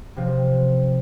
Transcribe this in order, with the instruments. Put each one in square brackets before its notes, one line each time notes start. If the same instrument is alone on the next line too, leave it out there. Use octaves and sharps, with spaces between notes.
[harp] C3 F3 C4